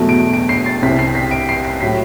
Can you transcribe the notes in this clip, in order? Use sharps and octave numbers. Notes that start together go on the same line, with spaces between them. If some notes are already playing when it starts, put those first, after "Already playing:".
Already playing: E2 B2 F#3 A3
D7
D7
C7
A6
C2 C3 G3 B6
C7
B6
D7
C7
C7
A2 F#3 B6